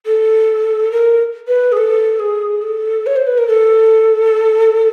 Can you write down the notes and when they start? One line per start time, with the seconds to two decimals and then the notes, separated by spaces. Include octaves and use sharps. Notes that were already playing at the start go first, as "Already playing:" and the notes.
0.06 A4
0.91 A#4
1.47 B4
1.72 G#4
1.77 A4
2.19 G#4
2.62 A4
3.06 C#5
3.16 C5
3.27 B4
3.38 A#4
3.47 A4